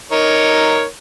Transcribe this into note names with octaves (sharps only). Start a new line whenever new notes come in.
D#4 A#4 C#5